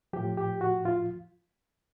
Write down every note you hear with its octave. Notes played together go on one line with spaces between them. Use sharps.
A2 F3 G4
G4
F#4
F4